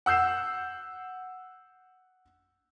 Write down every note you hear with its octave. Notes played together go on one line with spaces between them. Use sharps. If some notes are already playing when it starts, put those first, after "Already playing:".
F#5 E6 G6 C7 E7